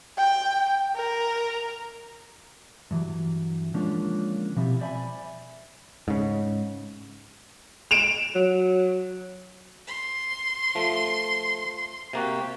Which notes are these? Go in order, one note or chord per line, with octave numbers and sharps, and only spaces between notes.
G5
A#4
G2 E3 F#3
D3 F3 G#3 A#3 C#4 D4
B2 F3 G3 C4 E4
C5 D5 E5 G#5 A5 B5
G#2 C#3
D7 E7 F7
F#3
C6
F3 A3
C3 A#3 F#4 G4